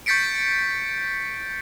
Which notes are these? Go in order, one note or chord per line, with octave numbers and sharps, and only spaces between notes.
C#6 G6 A6 B6 C#7 D7